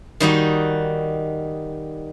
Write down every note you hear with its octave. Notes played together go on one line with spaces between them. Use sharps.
D#3 G3 D#4 F#4